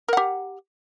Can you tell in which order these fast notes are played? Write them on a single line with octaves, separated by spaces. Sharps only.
A#4 F#5 G4